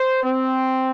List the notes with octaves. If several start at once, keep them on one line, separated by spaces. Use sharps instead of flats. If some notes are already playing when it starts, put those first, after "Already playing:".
Already playing: C5
C4